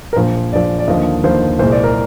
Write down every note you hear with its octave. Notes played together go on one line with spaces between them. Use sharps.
A#4
A#1 A#2 F3 C5
A#1 A#2 F3 D5
D5
D#2 D3 F3 A#3 D#5
D#2 D3 F3 A#3 C5
C2 A#2 G#3 C5
D5
A#4